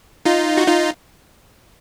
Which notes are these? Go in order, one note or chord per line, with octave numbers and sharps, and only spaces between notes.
D#4 F4
F#4
D#4 F4